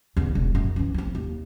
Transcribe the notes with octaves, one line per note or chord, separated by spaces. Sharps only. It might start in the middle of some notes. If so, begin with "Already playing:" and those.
E2 D3
E1
F#2
E3 C#4
B3 C4
D#2